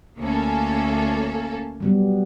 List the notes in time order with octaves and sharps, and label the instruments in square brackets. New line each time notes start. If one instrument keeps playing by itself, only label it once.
[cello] D2 [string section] A#3 C#4 A4
[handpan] F#3 G3 B3